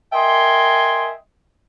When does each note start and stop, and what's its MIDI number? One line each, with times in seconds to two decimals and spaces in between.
0.13 1.11 70
0.13 1.11 75
0.13 1.11 76
0.13 1.11 79
0.13 1.11 80
0.13 1.11 84